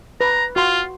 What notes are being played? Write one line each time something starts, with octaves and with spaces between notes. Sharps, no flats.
B4 A#5
F4 F#4 F5 C6